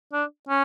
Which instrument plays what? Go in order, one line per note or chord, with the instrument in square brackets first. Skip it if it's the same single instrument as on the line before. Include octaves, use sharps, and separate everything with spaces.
[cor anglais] D4
C#4